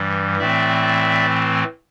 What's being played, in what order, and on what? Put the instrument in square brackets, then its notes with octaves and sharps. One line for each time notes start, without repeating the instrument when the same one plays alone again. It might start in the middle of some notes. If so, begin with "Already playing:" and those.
Already playing: [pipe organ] G2 E3 G3
A2 E3 A3 C4 D5 E5